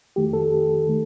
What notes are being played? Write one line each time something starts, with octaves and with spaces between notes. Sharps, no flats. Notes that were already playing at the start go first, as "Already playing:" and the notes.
F2 D#3 A3 G4
A4
D#3 A3